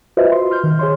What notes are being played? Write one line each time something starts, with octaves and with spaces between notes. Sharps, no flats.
F4 F#4 B4 C5 D#5 E5
C6
C6 F6 G6
D#3
G#4 C#5 C6